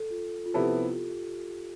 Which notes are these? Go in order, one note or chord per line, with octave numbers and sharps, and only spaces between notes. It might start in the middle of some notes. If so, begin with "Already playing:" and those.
Already playing: A4
F4
F4
C3 F3 B3 E4 G4 A4
F4